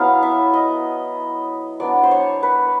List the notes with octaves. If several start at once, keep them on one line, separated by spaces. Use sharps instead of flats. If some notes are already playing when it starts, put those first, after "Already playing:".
Already playing: F#3 B3 E4 F5
E5
D#5
F#3 B3 D4 D5
C5
C#5
B4